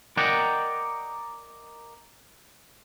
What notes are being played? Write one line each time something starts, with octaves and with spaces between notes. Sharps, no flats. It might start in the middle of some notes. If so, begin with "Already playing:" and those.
A#4 D5 D#5 F#5 G5 A#5